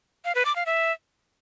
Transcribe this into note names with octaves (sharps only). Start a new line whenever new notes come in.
F5
B4
D6
F5
E5